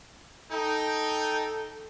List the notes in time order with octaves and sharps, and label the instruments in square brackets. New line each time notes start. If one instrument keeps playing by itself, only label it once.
[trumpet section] D#4 G5 [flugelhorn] A4